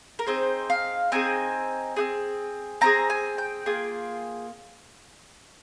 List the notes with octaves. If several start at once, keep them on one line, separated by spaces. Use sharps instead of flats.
A#4
C4 D#4 G#4 C5
F5
C4 D#4 G#4 G#5
C4 D#4 G#4
C4 D#4 G#4 A#5
G#5
G5
A#3 F4 G#4